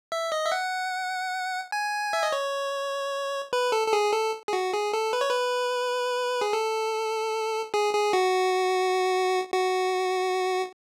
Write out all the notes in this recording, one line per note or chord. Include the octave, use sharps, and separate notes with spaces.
E5
D#5
E5
F#5
G#5
E5
D#5
C#5
B4
A4
A4
G#4
A4
G#4
F#4
G#4
A4
B4
C#5
B4
G#4
A4
G#4
G#4
F#4
F#4